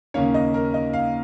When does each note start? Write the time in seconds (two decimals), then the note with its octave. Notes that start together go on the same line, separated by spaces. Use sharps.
0.14 D#2 C#3 A#3 C#4 C#5
0.34 D#5
0.54 A#4
0.74 D#5
0.93 F5